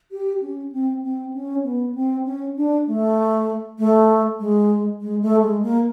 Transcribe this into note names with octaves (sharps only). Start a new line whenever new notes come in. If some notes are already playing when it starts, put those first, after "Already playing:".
G4
C#4
C4
C4
C#4
B3
C4
C#4
D4
A3
A3
G#3
G#3
A3
G#3
A#3